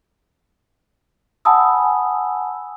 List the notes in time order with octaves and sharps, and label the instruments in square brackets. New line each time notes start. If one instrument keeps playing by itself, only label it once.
[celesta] F#5 G#5 A5 B5 D#6 E6